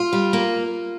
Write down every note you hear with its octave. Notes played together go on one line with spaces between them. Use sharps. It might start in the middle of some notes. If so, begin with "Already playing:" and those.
Already playing: F4
G3
A#3